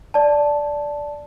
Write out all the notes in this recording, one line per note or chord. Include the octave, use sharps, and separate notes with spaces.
D5 A5